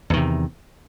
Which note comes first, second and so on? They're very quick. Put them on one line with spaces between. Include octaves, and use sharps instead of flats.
E2 D#3 C3